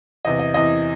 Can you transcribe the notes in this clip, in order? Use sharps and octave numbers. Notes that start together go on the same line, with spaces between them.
E2 C3 E3 D#5
D#5
E2 C3 E3 D#5